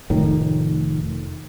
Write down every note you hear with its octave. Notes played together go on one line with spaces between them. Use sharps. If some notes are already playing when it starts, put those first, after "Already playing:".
F1 A2 D#3